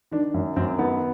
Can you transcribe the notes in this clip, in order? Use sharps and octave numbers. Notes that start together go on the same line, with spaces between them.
D#3 D4
F#2
F#2 C4
D#3 B3